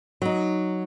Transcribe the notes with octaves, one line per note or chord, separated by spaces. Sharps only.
F#3 D#4